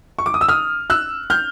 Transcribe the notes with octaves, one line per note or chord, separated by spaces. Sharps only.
C#6
D6
D#6
E6
D#6 F6
E6 F#6
F6 G6